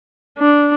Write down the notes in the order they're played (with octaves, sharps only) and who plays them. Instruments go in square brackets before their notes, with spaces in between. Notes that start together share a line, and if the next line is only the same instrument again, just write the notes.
[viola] D4